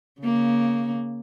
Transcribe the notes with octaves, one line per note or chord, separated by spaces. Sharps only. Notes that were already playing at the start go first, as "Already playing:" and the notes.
C#3 A#3